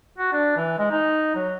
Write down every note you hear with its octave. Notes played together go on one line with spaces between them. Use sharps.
F#4
D4
E3
G#3
D#4
F#3